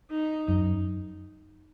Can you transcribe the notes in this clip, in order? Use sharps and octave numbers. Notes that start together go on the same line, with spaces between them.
D#4
F#2